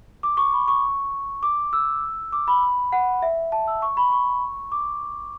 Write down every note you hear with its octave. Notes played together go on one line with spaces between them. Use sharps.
D6
C#6
B5
C#6
D6
E6
D6
B5
F#5
E5
A5
E6
C#6
B5
C#6
D6